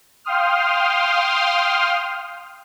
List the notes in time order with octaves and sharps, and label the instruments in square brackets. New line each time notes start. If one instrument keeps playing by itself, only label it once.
[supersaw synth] F5 G5 C6 D#6 F6